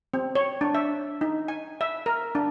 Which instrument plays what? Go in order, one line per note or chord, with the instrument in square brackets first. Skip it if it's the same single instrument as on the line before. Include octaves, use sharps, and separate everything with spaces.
[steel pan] C4
C#5
D4
E5
D#4
G#5
E5
A#4
D4